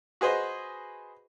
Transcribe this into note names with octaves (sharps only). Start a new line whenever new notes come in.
F#4 G#4 B4 C5 D#5